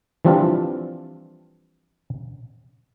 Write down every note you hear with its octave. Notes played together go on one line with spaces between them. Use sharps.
E3 F3 G3 C4 D4 F4